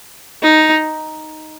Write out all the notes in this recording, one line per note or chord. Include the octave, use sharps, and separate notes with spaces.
D#4